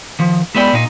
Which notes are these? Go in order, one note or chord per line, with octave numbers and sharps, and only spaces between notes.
D#3 F3
G#3 B3 E4 D5 G5
A#2 D#4